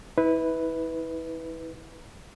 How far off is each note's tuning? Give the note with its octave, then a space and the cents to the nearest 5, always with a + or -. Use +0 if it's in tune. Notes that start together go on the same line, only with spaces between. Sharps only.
E4 -30 B4 +0